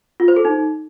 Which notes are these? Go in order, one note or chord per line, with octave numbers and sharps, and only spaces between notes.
F4
C5
A4
D#4